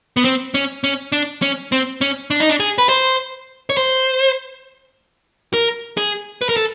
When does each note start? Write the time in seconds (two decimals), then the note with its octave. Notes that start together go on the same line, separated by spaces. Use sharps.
0.17 B3
0.24 C4
0.54 C#4
0.84 C#4
1.12 D4
1.42 C#4
1.72 C4
2.01 C#4
2.30 D4
2.40 D#4
2.50 D4
2.60 G#4
2.78 B4
2.89 C5
3.70 C#5
3.77 C5
5.54 A#4
5.97 G#4
6.42 B4
6.49 A#4
6.57 A4